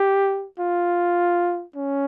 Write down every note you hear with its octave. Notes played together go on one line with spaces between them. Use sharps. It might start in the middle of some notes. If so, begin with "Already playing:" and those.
Already playing: G4
F4
C#4